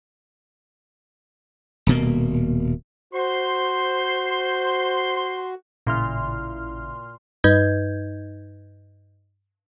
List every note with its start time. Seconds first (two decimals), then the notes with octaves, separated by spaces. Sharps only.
1.87 D#1 B2 A#3
3.13 F#4 C5 C6
5.87 A1 A#2 C#3 E4 C6 F6
7.44 G2 D#4 B4 D#5 G6 G#6